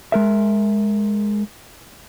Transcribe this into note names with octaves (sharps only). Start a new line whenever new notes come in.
G#3 A#4 E5